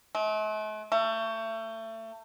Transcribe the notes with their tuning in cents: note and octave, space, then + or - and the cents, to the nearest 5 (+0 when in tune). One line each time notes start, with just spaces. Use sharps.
A3 -45
A3 +30